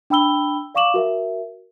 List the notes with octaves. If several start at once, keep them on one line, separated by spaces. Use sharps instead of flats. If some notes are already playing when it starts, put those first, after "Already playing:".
D4 G5 B5 E6 G7
D5 F5 C#6 D6 E7 F#7
F#4 A#4 E5